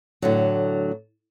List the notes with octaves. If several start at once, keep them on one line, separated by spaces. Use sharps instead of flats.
A2 D3 F#3